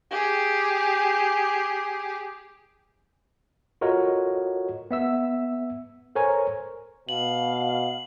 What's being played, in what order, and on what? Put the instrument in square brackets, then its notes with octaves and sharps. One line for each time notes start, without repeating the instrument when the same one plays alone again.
[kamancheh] G4 G#4
[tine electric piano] F4 F#4 A4 A#4 C#5 D#5
B3 E5 E6
A4 A#4 C5 C#5 G#5 A#5
[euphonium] B2 [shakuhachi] F5 [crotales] F#7